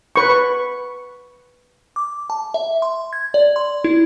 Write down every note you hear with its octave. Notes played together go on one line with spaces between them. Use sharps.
B4 C#6
D6
A5
E5
C6
G#6
D5
C6
E4